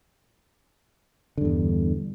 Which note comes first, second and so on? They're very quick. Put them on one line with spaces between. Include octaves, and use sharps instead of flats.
D3 G2 E2